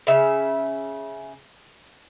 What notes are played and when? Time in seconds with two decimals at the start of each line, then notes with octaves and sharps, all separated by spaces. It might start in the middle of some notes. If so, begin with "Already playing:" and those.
0.07 C#3 E5